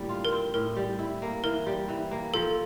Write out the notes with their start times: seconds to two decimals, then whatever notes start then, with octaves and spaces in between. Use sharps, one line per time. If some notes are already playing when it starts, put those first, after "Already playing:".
Already playing: A2 D3 G3 A#3
0.09 F4
0.25 A#4
0.32 C4
0.54 A2 A#4
0.76 G3
0.99 E4
1.22 A#3
1.44 E3 A#4
1.66 G3
1.88 E3
2.11 A#3
2.34 F3 A4